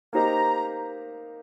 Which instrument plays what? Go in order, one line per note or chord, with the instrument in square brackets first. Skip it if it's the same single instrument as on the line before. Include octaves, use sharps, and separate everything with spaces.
[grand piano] A#3 D#4 G4 C5 D#5 [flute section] A#5